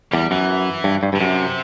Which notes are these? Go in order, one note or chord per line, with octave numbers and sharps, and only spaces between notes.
E2 G3
F#2 E3
G2
G2
G2 D3
F#2 C3